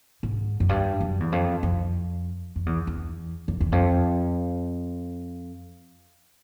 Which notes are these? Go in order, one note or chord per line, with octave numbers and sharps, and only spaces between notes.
G#2
F#2
G2
F#2
E2
F2
F2
F2
E2
E2
F2
E2
F2